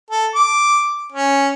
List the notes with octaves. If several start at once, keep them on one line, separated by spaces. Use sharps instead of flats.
A4
D6
C#4